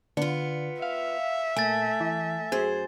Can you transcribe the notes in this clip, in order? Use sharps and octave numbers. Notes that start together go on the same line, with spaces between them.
D3 B3 F4 C#7
E5 F5
A#2 A3 G#5 A6
E3
F#2 G#4 C5